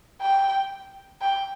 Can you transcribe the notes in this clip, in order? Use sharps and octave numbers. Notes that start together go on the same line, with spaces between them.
G5
G5